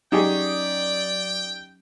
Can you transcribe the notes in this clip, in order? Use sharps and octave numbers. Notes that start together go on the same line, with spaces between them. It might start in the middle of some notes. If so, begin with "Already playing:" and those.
F#3 C#4 D#4 G4 G#4 D5 G5